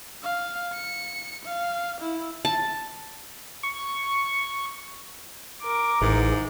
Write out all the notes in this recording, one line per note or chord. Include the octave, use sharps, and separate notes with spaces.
F5
C#7
F5
E4
A5
C#6
A#4 D6
A1 G#2 E3 G#4